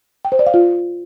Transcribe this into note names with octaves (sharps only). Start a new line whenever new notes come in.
G5
C5
D5
F5
F4